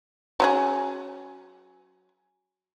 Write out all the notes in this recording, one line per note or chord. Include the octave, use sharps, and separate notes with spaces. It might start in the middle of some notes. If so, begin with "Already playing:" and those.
F#3 C#4 G#4